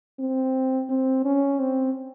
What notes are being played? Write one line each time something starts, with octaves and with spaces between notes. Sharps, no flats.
C4
C4
C#4
C4